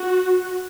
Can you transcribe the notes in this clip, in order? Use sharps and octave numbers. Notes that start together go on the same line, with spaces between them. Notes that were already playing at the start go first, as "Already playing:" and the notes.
Already playing: F#4